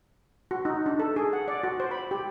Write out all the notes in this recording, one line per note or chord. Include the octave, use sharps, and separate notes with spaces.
F#4
D#4
D4
A4
G#4
F#5
D5
F#4
C5
B5
G4